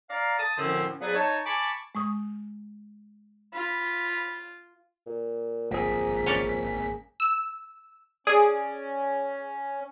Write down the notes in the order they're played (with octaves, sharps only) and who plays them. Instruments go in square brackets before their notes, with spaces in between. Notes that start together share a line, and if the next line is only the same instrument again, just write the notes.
[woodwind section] D5 F5 A#5
A5 D#6
F#2 A2 D3 F3 C4 C#4
F3 F#3 B3 G#4 B4 D5
D#4 C#5 A5
G#5 A5 B5 C#6 D6
[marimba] G#3 C#6 D#6
[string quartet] F4 [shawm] B5
[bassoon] A#2
[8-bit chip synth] G#1 B6 [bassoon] F3 [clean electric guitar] A#3 G#4
[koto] C#4 C#5 D5
[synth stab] E6
[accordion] C#4 [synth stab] G#4 [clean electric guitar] D5